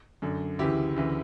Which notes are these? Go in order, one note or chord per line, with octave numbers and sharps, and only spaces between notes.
F#2 D3
D2 C#3 E3 E4 G4
D2 C#3 E3